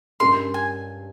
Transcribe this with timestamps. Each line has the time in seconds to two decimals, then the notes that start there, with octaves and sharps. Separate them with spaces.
0.20 G2 G3 C#4 G4 A#4 C6
0.54 G#5